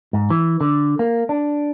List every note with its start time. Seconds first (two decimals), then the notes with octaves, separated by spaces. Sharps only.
0.13 G#2
0.30 E3
0.61 D3
0.99 A#3
1.29 D4